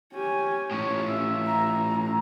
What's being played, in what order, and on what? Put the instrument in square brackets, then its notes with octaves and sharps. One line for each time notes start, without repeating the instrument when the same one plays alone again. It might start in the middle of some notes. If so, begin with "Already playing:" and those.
[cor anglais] C#4 [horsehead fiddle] G4 G#5
[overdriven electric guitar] A2 C#4 [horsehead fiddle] F4 [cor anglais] C#5
[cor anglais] E5
[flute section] A#5